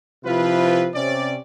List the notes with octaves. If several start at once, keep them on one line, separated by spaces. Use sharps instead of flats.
C3 F3 E4 F4 B4
C3 C#4 D5